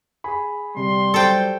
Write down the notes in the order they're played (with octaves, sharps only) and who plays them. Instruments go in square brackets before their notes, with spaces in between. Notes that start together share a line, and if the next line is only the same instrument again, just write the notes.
[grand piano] G#4 B5
[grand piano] C3 [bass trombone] G3 [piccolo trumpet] C6
[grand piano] F#3 C5 [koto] A4 G5